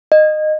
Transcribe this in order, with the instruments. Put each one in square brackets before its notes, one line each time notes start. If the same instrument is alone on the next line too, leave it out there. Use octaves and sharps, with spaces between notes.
[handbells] D#5